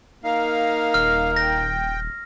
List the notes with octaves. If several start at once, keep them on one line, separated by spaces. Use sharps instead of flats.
A#3 D#4 A#4 F5
D#1 F6
G5 A#6